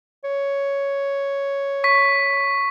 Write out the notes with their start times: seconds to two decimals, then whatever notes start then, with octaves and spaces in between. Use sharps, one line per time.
0.24 C#5
1.84 C#6 B6